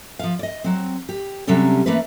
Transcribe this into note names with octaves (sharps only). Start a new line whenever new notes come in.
F3 F5
D5 D#5
F#3 C4
G4
C3 F#3 G3 C#4 A4
E3 A3 A#3 C#4 B4